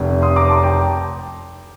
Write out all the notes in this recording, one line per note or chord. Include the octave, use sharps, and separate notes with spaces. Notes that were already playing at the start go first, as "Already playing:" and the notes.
Already playing: F1 F2 C3
C6 D#6
A#5 D6
A5 C6
G5 A#5